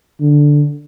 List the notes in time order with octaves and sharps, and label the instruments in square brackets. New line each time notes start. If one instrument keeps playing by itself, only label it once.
[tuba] D3